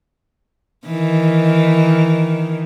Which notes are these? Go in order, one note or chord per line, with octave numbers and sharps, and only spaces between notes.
D#3 E3